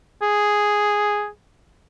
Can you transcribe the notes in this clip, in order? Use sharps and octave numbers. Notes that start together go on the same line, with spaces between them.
G#4